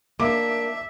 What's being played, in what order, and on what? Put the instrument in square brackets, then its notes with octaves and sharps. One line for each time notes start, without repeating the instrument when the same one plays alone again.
[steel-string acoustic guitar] A#3 D4 [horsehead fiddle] E5 [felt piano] D6